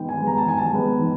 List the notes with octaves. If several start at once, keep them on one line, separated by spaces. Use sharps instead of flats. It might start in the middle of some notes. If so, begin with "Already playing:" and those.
Already playing: D#3 G#3 B3 G5
G#5
G#3 B3
A#5
A5
D#3 G#5
A5
G#3 B3
D#3